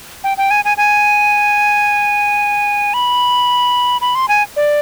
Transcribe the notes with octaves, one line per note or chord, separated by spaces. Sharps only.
G5
G5
G#5
G#5
G#5
B5
B5
C6
G#5
D5